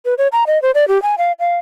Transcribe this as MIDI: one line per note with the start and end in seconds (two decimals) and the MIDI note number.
0.05 0.14 71
0.18 0.28 73
0.32 0.44 82
0.47 0.61 75
0.62 0.71 72
0.75 0.88 74
0.88 1.01 67
1.02 1.15 80
1.18 1.32 77
1.39 1.57 77